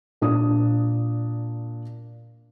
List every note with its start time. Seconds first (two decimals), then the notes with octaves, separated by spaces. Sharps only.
0.22 A#2 D4 D#6